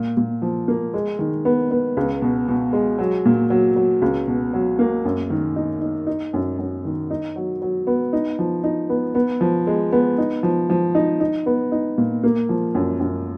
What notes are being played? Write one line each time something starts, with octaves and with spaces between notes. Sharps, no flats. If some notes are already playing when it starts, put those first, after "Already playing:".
Already playing: A#2
A#2
F3
A#3
G#3
D#3
B3
B3
C#2
B2
B2
G#3
F#3
A#2
F#3
F#3
C#2
B2
F#3
A#3
F#2
D#3
D#4
D#4
D#4
F#2
F#2
D#3
D#4
F#3
F#3
B3
D#4
F3
D#4
B3
B3
F3
G#3
B3
D#4
F3
F3
D#4
D#4
B3
D#4
A#2
A#3
F3
F#2
F#2